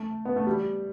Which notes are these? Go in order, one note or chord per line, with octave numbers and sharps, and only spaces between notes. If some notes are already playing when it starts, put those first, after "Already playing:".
Already playing: A3
B3
A3
G3